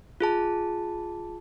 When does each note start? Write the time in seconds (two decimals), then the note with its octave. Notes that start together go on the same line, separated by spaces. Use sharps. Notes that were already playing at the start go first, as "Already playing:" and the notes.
0.20 F4 G#4 A5